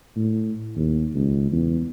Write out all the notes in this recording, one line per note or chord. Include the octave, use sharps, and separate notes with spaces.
A2
D#2
C#2
E2